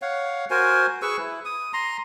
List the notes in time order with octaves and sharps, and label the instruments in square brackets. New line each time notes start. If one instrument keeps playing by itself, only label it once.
[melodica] C#5 F5 F#5
F#4 A#4 C5 G#5
G#4 B4 C#6 E6
E4
D#6
A#5 C6